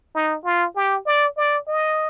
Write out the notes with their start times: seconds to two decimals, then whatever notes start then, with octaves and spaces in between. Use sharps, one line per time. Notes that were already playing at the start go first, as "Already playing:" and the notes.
0.15 D#4
0.44 F4
0.76 G4
1.06 D5
1.37 D5
1.67 D#5